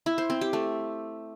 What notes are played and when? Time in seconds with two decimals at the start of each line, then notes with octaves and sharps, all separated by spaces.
0.06 E4
0.18 C5
0.30 C4
0.41 G4
0.53 A3